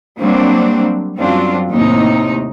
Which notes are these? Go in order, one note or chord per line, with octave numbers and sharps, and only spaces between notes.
F#3 G3 A#3 C4 D4
F#2 F#3 G3 C4 D4 F4
D#2 A2 C3 D#4